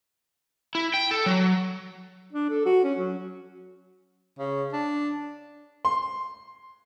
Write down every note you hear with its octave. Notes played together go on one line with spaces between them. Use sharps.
E4
G5
A4
F#3
D4
A4
F#4
C#4
F#3
C#3
D4
C6